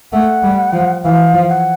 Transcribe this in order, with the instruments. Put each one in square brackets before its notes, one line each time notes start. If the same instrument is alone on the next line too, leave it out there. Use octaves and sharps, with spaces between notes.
[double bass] A3 [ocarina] F#5
[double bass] G3
F3
[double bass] E3 [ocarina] F5
[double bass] F3
[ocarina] F#5